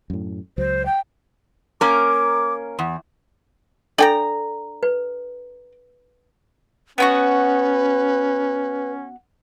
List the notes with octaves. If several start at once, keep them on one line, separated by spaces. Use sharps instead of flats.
F#2 A2
C#2 F#3 C5
G5
A#3 C#4 A#4 D6
E2
D4 A4 D5 G5 A#5
B4
B3 C#4 E4 F#4 B4